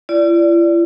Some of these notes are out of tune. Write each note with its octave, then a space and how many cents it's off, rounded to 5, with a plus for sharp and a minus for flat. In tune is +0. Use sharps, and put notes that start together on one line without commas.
E4 +45 D5 -10